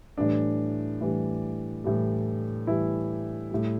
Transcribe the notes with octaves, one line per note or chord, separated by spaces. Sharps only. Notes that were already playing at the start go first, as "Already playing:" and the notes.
A2 E3 G3 D4
A2 E3 G3
A2 E3 G3
A2 E3 G3 E4
A2 G3